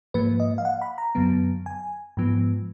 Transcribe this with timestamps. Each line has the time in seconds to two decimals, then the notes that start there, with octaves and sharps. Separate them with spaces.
0.14 G#2 F3 A#3 B4
0.40 D#5
0.58 F5
0.65 F#5
0.82 B5
0.98 A#5
1.15 F#2 D3 F#3 B3
1.66 G#5
2.17 G#2 F3 B3